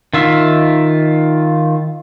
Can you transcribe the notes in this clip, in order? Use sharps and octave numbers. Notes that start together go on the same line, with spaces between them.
D#3 F4 E5